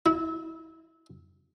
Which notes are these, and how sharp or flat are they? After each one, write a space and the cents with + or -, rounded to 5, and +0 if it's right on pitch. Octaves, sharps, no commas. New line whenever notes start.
E4 -25